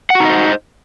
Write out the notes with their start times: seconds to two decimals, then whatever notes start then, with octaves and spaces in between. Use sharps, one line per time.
0.10 F#5
0.15 F#4
0.20 D#4
0.25 D#5
0.30 C5